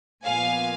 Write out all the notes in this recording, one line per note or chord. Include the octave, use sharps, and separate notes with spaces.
A#2 F3 B3 F5 G#5